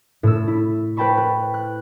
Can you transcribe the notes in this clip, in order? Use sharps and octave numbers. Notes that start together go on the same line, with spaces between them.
A2 A4 E6
E4
B4 C5 G5 A5 B5 C#6
B4
F#6